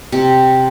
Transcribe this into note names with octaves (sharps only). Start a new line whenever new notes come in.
C3